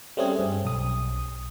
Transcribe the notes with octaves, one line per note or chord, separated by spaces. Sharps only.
G3 A3 C4 C#4 G#4
G2
B1 D#6